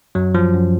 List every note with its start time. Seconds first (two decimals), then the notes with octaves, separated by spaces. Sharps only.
0.15 F#2 F#3
0.35 F#2 F3
0.54 F#2